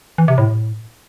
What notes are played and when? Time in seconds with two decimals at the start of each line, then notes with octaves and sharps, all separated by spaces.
0.18 E3
0.28 C3
0.38 A2